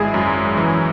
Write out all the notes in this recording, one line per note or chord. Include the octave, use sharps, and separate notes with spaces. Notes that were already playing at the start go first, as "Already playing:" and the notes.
Already playing: G#1 G#3 E4 G#4
F#2
E3